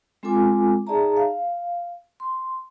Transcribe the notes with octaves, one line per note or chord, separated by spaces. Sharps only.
G#3 C4 F4 A4 G#5 D6
D#4 G#4 D5 E5 A5 A#5
F5
C6